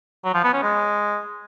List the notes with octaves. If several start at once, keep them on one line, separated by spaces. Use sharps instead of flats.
F#3
F3
B3
C#4
G#3